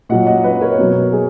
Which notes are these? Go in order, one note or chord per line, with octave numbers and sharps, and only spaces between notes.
A#2 F#3 D#5 F#5
D#5 F#5
B4 D#5
A#4 C#5
B2 F#3
G#4